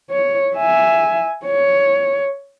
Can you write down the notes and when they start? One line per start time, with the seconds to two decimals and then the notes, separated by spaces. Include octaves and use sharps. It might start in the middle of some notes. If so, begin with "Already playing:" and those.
0.11 C#5
0.57 E5 G#5
1.46 C#5